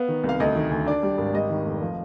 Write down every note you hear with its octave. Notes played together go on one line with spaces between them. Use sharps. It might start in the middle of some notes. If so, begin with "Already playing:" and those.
Already playing: B3 F5
D#3
C2
F5
D2 D#5
D#3
D2
D4 D5
G3
G#1
G3 D#5
D#3
F1
F3